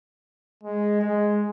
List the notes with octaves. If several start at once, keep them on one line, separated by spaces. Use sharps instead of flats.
G#3
G#3